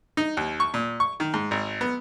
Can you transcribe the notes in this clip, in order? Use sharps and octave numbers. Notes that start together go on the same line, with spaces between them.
D#4
D#2
C#6
A#2
C#6
D#3
G#2
G#1
B3